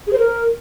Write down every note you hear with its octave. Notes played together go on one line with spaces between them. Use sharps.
G#4
C5
A#4